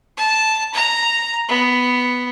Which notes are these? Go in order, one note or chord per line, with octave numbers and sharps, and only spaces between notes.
A5
A#5
B3